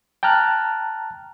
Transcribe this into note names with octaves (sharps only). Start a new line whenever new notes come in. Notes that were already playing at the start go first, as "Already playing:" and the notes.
G5 A5 A#5 F6 F#6